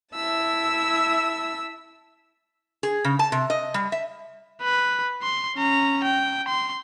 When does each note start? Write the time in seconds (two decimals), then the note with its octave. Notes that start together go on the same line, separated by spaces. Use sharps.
0.15 E4 E5 A5 E6
2.83 G#4
3.04 C#3
3.19 A5
3.32 C3
3.50 D#5
3.74 G3
3.92 E5
4.62 B4
5.23 C6
5.56 C#4 A#5
6.04 G5
6.48 C6